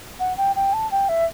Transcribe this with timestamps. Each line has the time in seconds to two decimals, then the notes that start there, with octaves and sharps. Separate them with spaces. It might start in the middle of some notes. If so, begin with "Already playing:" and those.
0.19 F#5
0.37 G5
0.56 G5
0.73 A5
0.91 G5
1.09 E5